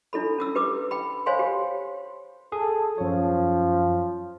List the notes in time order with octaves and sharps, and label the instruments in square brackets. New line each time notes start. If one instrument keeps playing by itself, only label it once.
[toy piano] D4 E4 A4 B5
C#4 D#6 E6
G4 B4 D6 D#6
G5 B5
C5 C#5 F5 G#5 B5 C6
G4
[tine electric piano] G#4 [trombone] A4
[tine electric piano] F#2 C#5 [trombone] F3